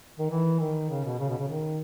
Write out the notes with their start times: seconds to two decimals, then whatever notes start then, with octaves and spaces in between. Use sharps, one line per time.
0.18 D#3
0.30 E3
0.59 D#3
0.89 C#3
1.04 B2
1.19 C#3
1.29 B2
1.39 C#3
1.48 D#3